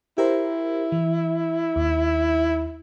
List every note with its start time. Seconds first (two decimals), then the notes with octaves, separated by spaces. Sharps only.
0.18 E4 G4 A#4 C5
0.92 E3
1.76 D#2